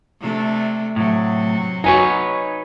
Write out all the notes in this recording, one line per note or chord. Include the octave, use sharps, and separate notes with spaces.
C3 A3 D4
A2 C3 F#3
D#4 F#4 B4 C#5 G#5